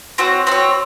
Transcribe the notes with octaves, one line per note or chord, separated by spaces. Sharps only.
C4 F#4 C#5
C4 F#4 C#5